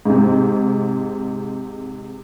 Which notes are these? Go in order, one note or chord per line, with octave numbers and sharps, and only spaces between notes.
G#2 C3